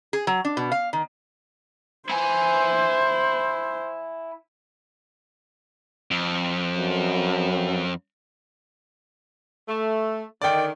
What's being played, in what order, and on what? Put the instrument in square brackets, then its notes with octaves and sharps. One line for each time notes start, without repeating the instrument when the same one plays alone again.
[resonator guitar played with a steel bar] G#4
F#3
D4
B2
F5
D#3
[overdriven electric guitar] E4 G#5 [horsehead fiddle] C5
[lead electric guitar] F2
[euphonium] F#2
[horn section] A3
[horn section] D3 D#3 [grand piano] D5 G5